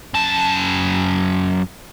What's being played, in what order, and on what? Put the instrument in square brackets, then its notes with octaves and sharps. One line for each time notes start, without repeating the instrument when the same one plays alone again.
[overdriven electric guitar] F#2 A5